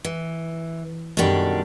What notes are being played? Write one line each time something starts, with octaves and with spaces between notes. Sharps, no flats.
E3
F#2 B2 D3 D#3 G3 D4